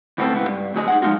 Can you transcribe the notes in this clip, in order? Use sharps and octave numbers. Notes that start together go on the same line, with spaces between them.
D2 A2 B3 C4 F4 A4
C#2 E3 B3
G2
D2 F#3 G#4 D#5
D#4 G#4 F#5
F3 G#3 C4 D#4 F4 F#4